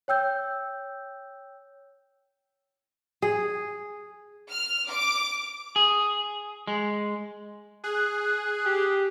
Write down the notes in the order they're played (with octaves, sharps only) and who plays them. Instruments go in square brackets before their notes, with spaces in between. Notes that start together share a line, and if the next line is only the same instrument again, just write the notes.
[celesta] C#5 G5 E6 G6
[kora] G#4
[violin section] F6
D6
[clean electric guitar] G#4
G#3
[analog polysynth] G#4 [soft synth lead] F#6
[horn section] G4